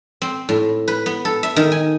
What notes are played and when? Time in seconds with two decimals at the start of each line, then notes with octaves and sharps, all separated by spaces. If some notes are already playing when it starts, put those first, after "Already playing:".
0.22 C4
0.49 A2
0.88 B4
1.06 B3
1.25 A4
1.43 E5
1.56 D#3
1.72 G#5